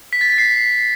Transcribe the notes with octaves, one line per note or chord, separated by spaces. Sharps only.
B6
A6
B6
C7